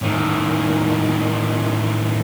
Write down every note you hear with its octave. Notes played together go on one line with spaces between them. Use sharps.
A2 D#3